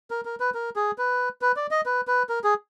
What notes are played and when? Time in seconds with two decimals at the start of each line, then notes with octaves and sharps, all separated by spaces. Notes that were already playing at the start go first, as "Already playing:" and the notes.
0.11 A#4
0.25 A#4
0.40 B4
0.54 A#4
0.76 G#4
0.98 B4
1.42 B4
1.56 D5
1.71 D#5
1.86 B4
2.07 B4
2.29 A#4
2.44 G#4